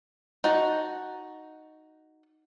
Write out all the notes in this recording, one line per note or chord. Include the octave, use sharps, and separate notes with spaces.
D#4 F#4 A5